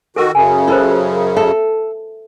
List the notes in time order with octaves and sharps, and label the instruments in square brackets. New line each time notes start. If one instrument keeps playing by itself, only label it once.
[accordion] D#3 F#4 [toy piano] A4 A#4
[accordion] F#2 C#3 [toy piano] G#5
[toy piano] F4 A#4 C5 [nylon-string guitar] A4
[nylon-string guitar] A4 [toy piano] E5